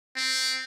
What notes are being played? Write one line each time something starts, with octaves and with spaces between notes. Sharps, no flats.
C4